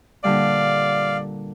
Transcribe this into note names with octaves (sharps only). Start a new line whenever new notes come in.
A#2 D3 G3 D5 F5